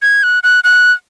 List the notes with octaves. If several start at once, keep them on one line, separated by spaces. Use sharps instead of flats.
G#6
F#6
F#6
F#6